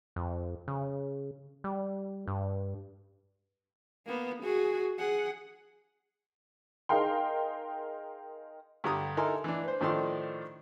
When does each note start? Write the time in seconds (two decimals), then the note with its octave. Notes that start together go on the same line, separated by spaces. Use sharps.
0.16 F2
0.68 C#3
1.64 G3
2.28 G2
4.06 A#3 B3
4.43 F#4 G#4
4.99 G#4 F#5
6.89 D#4 G#4 A#4 F5 G5 C6
8.84 G2 D3 G4 A#5 D#6
9.17 D#4 E4 A4 A#4 G#5 C6
9.44 E3 D4
9.64 B4 C5
9.81 A2 D#3 F3 D4 A4 C6